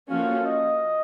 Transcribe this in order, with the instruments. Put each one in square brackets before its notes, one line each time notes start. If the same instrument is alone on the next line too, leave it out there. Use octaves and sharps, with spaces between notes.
[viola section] F3 A#3 C#4 F#4 A4 [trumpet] F5
[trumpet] D#5